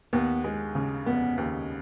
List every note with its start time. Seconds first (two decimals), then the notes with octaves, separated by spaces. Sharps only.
0.13 D#2 B3
0.44 G#3
0.75 C#3
1.06 F1 B3
1.38 D#2